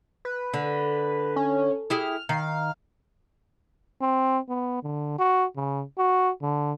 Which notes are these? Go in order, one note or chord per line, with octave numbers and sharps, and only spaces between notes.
B4
D3
C#4
E4 G4 G#4 F6
D#3 F5
C4
B3
D3
F#4
C#3
F#4
D3